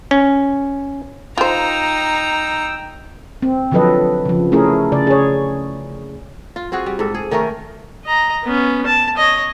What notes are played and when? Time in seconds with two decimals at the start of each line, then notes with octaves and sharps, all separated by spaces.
0.11 C#4
1.38 D#4 F4 C5 G5 A#5 E6
3.42 C4
3.71 D3 F3 F#3 A4 B4 D#5
4.25 C#3 F3
4.52 A3 C#4 E4 G#4 A#4
4.92 C#3 D5
5.07 G#4 C#5
6.56 F4
6.72 C4 F4 F#4 G#4
6.86 G3
6.99 G#2 A4
7.14 G#4
7.31 D#3 A3 C#4 A#4
8.05 D#5 A#5
8.44 B3 C#4
8.86 A5
9.17 C#5 D#5